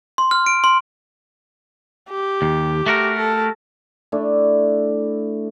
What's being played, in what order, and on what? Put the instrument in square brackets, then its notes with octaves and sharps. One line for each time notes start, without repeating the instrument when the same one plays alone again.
[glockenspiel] C6
F6
D7
C6
[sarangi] G4
[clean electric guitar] D#2
A3 F#4 A#4
[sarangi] A4
[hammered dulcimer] A3 D4 E4